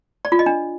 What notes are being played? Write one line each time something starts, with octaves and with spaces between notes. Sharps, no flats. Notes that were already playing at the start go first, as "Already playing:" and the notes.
D5
F4
D#5
D4